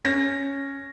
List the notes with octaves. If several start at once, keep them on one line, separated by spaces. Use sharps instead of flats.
C#4 A#6